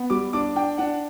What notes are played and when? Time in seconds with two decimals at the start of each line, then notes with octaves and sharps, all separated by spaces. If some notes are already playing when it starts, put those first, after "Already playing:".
Already playing: B3
0.10 G3 D6
0.33 D4 D6
0.56 D4 G5
0.78 D4 F#5